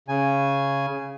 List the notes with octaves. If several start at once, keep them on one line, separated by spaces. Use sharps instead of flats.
C#3 G#5